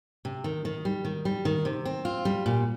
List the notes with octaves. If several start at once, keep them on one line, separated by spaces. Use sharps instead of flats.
C3
D#3
D#3
G3
D#3
G3
D#3
C3
C4
F4
G3
A#2